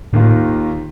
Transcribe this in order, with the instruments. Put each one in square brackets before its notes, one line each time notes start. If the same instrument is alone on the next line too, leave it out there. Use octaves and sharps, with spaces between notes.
[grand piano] D#2 D#3 A#3 F4 [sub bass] A2